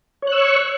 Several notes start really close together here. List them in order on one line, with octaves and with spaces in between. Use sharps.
C#5 F#6 E6 C#6